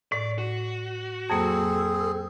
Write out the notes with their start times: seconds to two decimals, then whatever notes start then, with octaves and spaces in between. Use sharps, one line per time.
0.12 A2 D5
0.38 F#4
1.30 F2 F#3 A#3 C4 G#4 A4